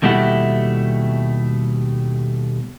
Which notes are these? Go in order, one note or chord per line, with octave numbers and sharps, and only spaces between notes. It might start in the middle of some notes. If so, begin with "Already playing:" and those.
D#2 B2 G3 A3 E4 F#5